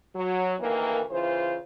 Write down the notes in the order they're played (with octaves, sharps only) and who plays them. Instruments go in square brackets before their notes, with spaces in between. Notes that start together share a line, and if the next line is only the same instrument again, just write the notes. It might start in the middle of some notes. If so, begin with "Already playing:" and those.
[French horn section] F#3
D2 D#3 E3 A#3
C#3 E3 F4 C5